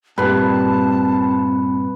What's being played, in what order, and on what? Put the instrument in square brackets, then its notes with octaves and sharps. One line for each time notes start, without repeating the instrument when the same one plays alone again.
[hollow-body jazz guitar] G2 A#2 [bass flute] C4 [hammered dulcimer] B4 [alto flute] A5